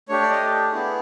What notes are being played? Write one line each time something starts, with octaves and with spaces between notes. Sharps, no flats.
A3 D4 G4 C#5
D5
D#5
B3 E4 G#4